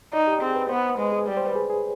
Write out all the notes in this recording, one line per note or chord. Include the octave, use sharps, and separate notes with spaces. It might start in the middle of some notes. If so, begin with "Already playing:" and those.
D#4 D5
G4
C4 G#4
B4
B3 C5
G#3 B4
G#4
G3 D5
C5
B4
G#4
G#4